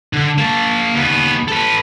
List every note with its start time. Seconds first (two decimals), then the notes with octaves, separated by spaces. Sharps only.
0.13 D3
0.38 A#3 A5
0.94 D#2 B3
1.48 A4 B4